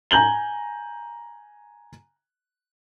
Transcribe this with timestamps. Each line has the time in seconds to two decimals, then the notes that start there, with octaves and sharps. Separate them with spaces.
0.11 G#5 A#5 G6 F#7 G7